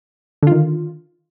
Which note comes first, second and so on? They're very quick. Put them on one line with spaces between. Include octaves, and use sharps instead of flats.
D3 F4 D#3